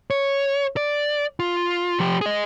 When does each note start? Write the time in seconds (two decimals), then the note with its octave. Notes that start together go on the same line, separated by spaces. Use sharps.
0.10 C#5
0.77 D5
1.40 F4
2.00 F3 G4
2.21 G#4 D#5